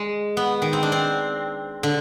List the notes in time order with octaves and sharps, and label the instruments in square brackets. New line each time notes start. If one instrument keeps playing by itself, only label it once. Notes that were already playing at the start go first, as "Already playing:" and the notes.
Already playing: [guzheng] G#3
B3
D#3
C4
D4
C4
D3